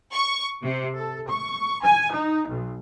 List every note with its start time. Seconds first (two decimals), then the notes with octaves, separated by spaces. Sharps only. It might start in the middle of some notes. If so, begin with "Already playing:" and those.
0.14 C#6
0.62 C3
0.96 A4
1.28 C#6
1.83 G#5
2.12 D#4
2.48 B1